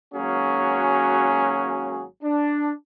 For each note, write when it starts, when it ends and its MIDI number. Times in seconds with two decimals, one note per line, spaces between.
0.14 2.03 32
0.14 2.03 54
0.14 2.03 58
0.14 2.03 61
0.14 2.03 66
0.14 2.03 68
2.23 2.71 62